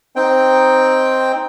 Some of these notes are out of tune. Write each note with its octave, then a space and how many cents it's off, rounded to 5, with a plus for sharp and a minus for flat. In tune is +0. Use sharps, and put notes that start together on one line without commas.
C4 +0 D#4 +0 G5 +0